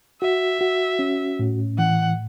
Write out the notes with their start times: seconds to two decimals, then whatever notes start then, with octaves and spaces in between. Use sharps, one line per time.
0.21 F#4 E5
0.61 F#4
0.99 C#4
1.39 A2
1.78 E3 F#5